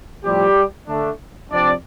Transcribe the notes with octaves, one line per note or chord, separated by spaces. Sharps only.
A2 F3 G3 C4 G4
D3 A3 D4
C3 F3 C4 D4 D5